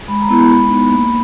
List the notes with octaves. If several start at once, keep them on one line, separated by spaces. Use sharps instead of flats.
G#3 B5
A#5
B3 E4 B5
G#3 B5
B3 D#4
A#3